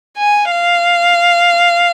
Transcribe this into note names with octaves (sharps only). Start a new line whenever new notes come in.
G#5
F5